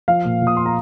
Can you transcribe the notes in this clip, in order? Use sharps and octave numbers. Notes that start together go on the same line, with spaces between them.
F3 F5
A#2
A#2
D#6
C6
A#5